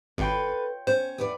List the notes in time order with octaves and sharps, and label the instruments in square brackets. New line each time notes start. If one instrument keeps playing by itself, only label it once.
[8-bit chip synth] G#1 [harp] F4 C#5 G5 [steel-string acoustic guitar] A4 B4
[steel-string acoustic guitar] C#4 [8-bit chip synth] C5
[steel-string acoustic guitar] E2 B3 D5